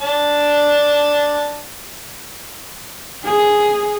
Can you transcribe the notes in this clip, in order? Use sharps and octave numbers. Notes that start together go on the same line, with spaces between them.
D4 A5
G#4